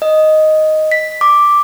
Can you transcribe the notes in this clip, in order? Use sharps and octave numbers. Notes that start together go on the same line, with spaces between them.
D#5
B6
D6